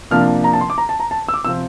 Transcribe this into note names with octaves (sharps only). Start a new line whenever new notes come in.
C3 F3 A#3 D4 F6
A#5
A5
C6
D6
A#5
A5
A#5
A5
E6
D6
C3 F3 C4 E6